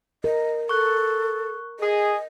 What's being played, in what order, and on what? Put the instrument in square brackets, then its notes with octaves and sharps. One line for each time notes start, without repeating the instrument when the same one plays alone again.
[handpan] A#4 [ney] D#5
[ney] A4 [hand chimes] C#6 F#6
[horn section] G#4 [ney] D#5